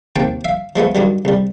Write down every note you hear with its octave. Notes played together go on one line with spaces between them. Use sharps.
D#2 C3 G5 A5
E5 F5
F3 G#3 A3 B3
G2 D#3 F#3 G3
C2 G3